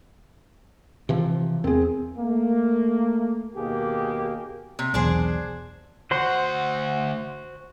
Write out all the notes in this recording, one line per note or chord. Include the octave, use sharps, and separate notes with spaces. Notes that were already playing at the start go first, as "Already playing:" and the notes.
C3 E3 F3
E2 C4 G#4
A3 A#3
D#2 B2 A#3 G4 G#4
C3
B1 E2 D4 G#4 C5
D2 F#4 C5 F#5 C6